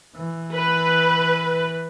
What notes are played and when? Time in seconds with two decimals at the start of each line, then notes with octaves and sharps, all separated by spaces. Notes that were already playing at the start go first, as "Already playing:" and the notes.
0.16 E3
0.54 B4